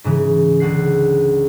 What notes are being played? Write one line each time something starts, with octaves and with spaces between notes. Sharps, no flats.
G#2 C#3 E3
C#2 D3 F#5 C7